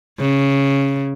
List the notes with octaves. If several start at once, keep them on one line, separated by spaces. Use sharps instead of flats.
C#3